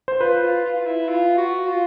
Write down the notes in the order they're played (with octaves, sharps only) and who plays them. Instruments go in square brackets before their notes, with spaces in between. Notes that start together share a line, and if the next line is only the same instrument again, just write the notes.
[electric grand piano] C5
[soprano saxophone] F4 [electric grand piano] B4
[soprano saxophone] F4
F4
F4
E4
F4
F#4
F4